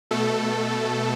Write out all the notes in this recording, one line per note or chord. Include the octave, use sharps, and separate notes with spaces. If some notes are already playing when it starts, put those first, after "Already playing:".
B2 A3 A4